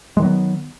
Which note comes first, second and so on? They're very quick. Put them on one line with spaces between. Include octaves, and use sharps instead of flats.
G#3 D#3 F#3 B3